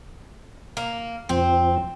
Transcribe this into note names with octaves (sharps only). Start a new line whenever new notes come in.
A#3
F2 F3 C4